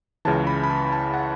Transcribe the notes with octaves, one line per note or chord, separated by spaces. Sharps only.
C#2 C#3 E3 A5
B5
B5
A5
A5
F#5